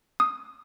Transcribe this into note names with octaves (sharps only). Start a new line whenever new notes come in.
D#6